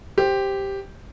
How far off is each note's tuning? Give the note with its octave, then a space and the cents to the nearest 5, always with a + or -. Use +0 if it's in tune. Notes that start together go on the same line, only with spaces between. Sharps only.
G4 +0 C5 +0